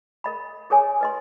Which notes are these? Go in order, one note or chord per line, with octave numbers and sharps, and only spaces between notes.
A#4 D#5 B5
G#4 A#4 C#5 G#5
B4 D#5 C6